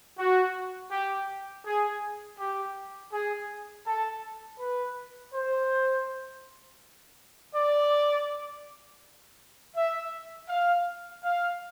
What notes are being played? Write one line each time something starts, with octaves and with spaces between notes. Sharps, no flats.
F#4
G4
G#4
G4
G#4
A4
B4
C5
D5
E5
F5
F5